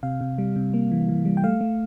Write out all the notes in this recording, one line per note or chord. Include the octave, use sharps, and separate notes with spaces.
C3 F5
C3
G3
C3
A#3
E3
E3
G3
G5
A3 F5
A3